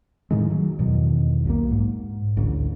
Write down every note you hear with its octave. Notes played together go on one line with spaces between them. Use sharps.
A2 D#3 G#3
F#3
E2 B2 D#3
B1 F3 A#3
G#2
A1 D2